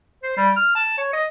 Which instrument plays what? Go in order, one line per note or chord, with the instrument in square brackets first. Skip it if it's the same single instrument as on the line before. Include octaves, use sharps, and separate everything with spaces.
[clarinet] C5
G3
F6
A5
C#5
D#5